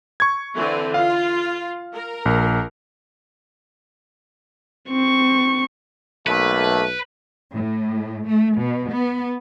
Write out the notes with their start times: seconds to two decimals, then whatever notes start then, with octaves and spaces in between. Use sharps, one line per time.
0.20 C#6 G#6
0.54 D3 E3 C4
0.94 F4 F5
1.94 A#4
2.25 A#1
4.89 C4 C#6
6.27 B1 A3 A#3 B4
7.54 A2
8.28 A3
8.58 B2
8.91 B3